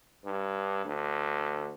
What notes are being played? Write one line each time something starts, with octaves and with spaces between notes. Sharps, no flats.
G2
D2